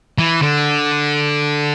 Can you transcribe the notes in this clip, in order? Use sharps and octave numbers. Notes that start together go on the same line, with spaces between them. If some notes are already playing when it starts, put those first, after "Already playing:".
E3
D3